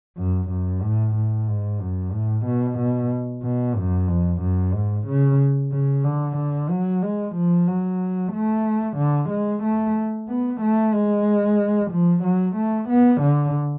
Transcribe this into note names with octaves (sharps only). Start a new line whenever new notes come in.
F#2
F#2
A2
A2
G#2
F#2
A2
B2
B2
B2
F#2
F2
F#2
G#2
C#3
C#3
D3
D3
F#3
G#3
F3
F#3
A3
D3
G#3
A3
B3
A3
G#3
F3
F#3
A3
B3
D3